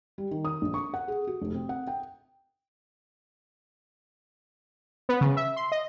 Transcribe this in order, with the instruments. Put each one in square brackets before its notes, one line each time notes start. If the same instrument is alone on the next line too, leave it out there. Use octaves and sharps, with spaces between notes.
[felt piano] G3
D#3
D#6
A#1
C#6
F#5
G#4
F#4
F1
C4
F#5
G5
[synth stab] B3
C#3
E5
C6
D#5